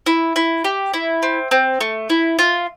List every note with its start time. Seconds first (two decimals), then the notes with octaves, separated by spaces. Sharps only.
0.06 E4
0.36 E4
0.64 G4
0.94 E4
1.23 C4
1.51 C4
1.81 A3
2.10 E4
2.39 F4